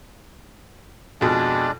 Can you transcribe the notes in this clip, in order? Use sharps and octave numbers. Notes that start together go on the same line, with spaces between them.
F2 B2 G#3 D4 D5